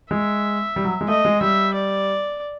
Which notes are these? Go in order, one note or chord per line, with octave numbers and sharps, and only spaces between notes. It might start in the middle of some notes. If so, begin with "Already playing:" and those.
G#3 E5
G3
F#3
G#3
A3 D#5
G#3
G3 E5
D5